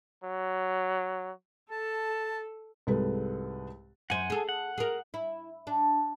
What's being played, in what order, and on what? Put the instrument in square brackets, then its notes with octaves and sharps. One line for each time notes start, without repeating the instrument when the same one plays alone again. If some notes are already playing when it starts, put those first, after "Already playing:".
[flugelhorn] F#3
[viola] A4 [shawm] A5
[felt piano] C2 G#2 A4 B4
[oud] F#2 C5 [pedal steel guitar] F#5 G#5
[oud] G#4 A4
[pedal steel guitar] F#5
[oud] G#4 A#4
E4
D4